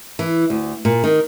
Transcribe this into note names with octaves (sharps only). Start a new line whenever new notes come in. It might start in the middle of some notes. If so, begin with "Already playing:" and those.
E3
D2
A#2
D#3